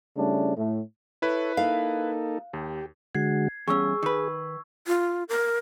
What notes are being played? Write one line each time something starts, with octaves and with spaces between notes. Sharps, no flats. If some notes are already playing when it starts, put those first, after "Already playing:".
C#3 G3 A3 C#4 D4 E4
A2
E4 A4 B4 C#5
A#3 D#4 A4 F5
D#2 G4
D3 G#3 F#4 G#6 C7
E2 G2 C#4 G#4 C#6 E6
D#3 B4
F4
A#4